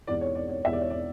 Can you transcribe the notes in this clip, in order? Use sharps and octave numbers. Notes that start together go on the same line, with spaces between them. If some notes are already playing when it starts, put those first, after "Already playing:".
E1 E2 E3 D5
C#5
D5
C#5
E1 E2 E3 E5
D5
C#5
D5